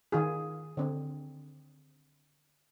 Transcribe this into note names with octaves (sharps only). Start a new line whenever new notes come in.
D#3 F4 G#4
D3 C4